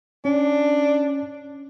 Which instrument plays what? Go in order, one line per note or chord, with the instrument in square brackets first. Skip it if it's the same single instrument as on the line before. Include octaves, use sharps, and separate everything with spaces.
[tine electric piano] C#4 [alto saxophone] D4